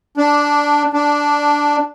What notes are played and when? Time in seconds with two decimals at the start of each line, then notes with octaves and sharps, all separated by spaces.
0.17 D4
0.93 D4